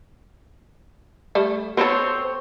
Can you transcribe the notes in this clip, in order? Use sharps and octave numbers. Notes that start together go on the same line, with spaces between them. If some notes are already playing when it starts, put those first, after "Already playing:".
G3 A3
B3 C4 A4 C5 C#5